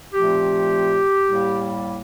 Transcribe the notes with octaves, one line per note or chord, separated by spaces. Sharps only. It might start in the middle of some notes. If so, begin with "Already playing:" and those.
A#2 F3 A3 C4 G4
A2 G3 A#3